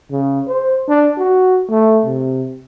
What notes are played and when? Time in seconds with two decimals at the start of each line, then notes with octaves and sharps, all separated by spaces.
0.11 C#3
0.48 C5
0.88 D4
1.18 F#4
1.70 A3
2.06 C3